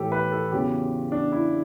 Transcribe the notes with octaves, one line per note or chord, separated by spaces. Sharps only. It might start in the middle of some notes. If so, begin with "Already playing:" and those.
Already playing: A2 E3 G4 A4
B4
A4
E2 C#3 F#3 G4
D4
E4